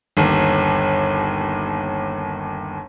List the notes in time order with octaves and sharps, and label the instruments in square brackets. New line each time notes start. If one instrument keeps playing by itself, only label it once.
[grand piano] G1 D#2